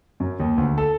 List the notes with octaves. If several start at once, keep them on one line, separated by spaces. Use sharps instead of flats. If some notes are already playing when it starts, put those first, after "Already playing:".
F#2
D#2
D2
A4